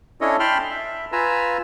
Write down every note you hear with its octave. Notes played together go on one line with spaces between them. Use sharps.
C#4 D4 E4 A4 C#5 D#5
G5 A5 B5 C6 F6
E5
F4 B4 G#5 A#5 E6